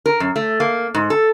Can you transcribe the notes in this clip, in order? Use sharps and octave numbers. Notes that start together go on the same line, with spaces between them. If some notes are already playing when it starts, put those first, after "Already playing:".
A#4
F#2
A3
A#3
G#2
A4